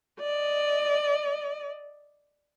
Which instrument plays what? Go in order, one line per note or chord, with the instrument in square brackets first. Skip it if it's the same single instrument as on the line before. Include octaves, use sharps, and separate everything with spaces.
[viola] D5 D#5